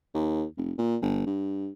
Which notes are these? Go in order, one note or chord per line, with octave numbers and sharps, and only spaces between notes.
D#2
F1
A#2
G1
G2